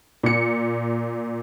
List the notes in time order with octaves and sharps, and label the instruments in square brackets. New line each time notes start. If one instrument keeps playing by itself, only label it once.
[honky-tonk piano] A#2 C#7